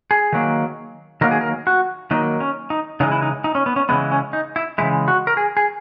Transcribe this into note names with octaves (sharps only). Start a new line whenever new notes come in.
G#4
D#3 F#3 A#3
D#3 F#3 A#3 A#4
G#4
A#4
F#4
D#3 F#3 A#3 D#4
C#4
D#4
C#3 E3 G#3 D#4
E4
D#4
D#4
C#4
B3
C#4
C#3 E3 G#3 B3
C#4
D#4
E4
C#3 E3 G#3 E4
F#4
A#4
G#4
G#4